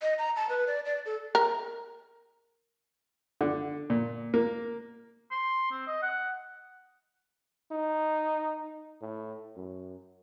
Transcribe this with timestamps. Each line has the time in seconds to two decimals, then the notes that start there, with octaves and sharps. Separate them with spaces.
0.02 D#5
0.18 A#5
0.36 A5
0.49 B4
0.67 D5
0.85 D5
1.06 A4
1.35 A#4
3.41 D3
3.90 A#2
4.34 A#3
5.31 C6
5.71 C4
5.87 D#5
6.02 F#5
7.72 D#4
9.01 A2
9.57 F#2